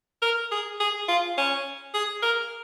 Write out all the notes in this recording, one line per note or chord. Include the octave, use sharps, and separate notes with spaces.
A#4
G#4
G#4
F4
C#4
G#4
A#4